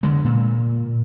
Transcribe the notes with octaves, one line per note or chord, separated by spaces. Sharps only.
D3 G#3
A#2